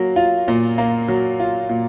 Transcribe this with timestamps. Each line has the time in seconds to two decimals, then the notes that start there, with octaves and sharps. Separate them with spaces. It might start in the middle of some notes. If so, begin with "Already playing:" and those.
Already playing: F#3 A#3
0.16 F4
0.48 A#2
0.78 A#3
1.08 F#3
1.40 F4
1.69 A#2